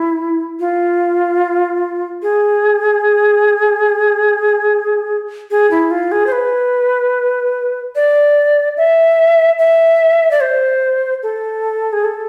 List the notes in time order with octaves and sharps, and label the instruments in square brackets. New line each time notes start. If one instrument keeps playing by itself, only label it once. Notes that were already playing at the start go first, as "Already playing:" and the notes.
Already playing: [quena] E4
F4
G#4
G#4
E4
F4
G#4
C5
B4
D5
E5
E5
D5
C5
A4
G#4
A4